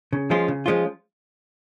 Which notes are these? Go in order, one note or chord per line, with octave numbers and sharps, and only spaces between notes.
C#3
F3 G#3 C#4 F4
C#3
F3 G#3 C#4 F4